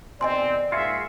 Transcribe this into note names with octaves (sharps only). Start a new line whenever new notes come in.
B2 D#3 C4 D5 D#5 G#5 C6
G#2 A#3 F4 F#4 G#4 E5